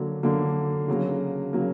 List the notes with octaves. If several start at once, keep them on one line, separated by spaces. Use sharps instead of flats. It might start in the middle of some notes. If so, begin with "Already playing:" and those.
Already playing: D3 F#3 A#3
D3 F#3 A#3
C#3 F#3 A#3
C#3 F#3 A#3